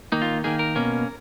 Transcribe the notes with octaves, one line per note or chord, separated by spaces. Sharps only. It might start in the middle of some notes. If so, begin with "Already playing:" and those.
D#3 A#3 D#4
F4
D#3 A#3 D#4 G#4
A#4
B2 A#3 C#4